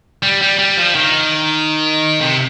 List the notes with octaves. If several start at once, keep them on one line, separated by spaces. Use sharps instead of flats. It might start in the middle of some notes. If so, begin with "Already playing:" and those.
G3
G3
G3
F3
D#3
C3